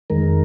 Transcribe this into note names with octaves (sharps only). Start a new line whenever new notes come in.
F2 D#3 G#3 A#4